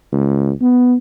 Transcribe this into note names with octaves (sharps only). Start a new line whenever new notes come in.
C#2
B3